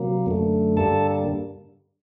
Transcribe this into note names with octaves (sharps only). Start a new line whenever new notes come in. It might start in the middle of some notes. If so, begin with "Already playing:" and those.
Already playing: C3 F#3 A#3
F#2 D3 A3
G2 D3 G3 A#3 A4 A5